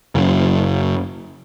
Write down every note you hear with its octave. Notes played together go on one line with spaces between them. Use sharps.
F#1